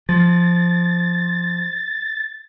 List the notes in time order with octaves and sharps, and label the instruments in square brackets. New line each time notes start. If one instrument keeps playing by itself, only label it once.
[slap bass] F3 [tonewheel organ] A6